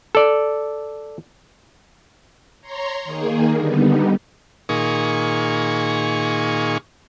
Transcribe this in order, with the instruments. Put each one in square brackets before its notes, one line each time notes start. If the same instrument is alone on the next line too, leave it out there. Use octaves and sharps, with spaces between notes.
[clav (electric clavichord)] A4 D5
[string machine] C#5 A#5 C6
D#3 A#3 G#4
D3 G3 B3 D#4
[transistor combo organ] A#2 D#3 G#4 C#6